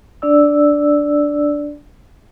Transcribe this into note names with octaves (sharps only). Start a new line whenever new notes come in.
D4 D5 E6